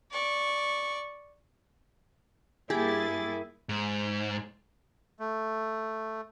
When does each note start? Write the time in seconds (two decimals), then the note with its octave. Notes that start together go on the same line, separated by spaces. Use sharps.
0.11 D5 C#6
2.70 G2 A#3 E4 G4 G#4 A6
3.69 G#2
5.19 A3